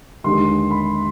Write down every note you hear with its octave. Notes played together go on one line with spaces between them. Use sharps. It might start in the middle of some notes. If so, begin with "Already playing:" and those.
D#2 D3 G#3 C6
B5